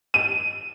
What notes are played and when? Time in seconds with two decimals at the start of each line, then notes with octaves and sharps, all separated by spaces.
0.14 D#7